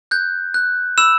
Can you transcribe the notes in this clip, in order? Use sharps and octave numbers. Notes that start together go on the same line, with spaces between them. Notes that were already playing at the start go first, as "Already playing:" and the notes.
F#6 G6
F#6
B5 E6 E7